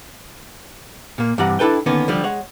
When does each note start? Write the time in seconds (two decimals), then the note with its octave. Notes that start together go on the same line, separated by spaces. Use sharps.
1.18 A#2 A#3
1.38 G2 C3 E3 F#5 A#5
1.59 D4 E4 A4 B4 G5
1.86 D3 D#3 A#3 B3 C#4
2.08 D3 F3 G3
2.24 G#3 C#5 F#5